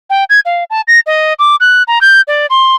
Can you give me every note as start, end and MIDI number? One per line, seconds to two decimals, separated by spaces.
0.10 0.24 79
0.30 0.40 92
0.45 0.64 77
0.70 0.81 81
0.88 1.00 94
1.07 1.33 75
1.39 1.56 86
1.60 1.83 90
1.88 1.99 82
2.01 2.21 91
2.28 2.46 74
2.50 2.75 84